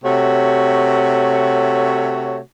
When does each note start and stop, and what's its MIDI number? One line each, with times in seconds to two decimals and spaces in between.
0.04 2.38 48
0.04 2.38 57
0.04 2.38 66
0.04 2.38 73